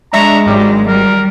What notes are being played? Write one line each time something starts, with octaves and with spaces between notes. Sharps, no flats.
G#3 D4 E5 A#5 C#6
G#1 F#3 G3
G3 A#4